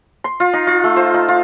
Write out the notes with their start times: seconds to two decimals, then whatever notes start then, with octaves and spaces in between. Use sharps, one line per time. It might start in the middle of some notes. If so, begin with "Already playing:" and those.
0.24 C6
0.40 F4
0.53 D#4
0.67 F4
0.84 A3
0.96 C5
1.14 D#4
1.28 F4